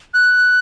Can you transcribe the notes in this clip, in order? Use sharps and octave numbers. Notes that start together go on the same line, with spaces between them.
F#6